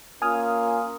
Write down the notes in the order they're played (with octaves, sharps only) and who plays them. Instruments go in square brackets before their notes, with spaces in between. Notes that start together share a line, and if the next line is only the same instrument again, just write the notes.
[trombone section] A#3 C#4 F4 [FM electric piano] G#5 D#6 F6